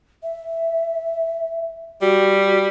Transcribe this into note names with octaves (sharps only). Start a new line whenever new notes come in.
E5
G3 F#4